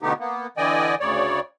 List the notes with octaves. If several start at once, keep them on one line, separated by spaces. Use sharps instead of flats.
B2 D3 A3 B3 D#4 G4
A#3 B3
D3 E3 D5 D#5 G5 G#5
D2 C#3 C#5 D5